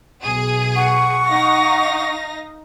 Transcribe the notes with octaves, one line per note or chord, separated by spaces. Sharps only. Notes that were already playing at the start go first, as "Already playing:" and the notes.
B1 G#4
F#5 C#6
D#4 F5 A#6